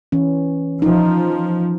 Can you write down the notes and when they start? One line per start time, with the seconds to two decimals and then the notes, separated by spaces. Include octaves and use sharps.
0.12 E3 C#4
0.82 F3 D#4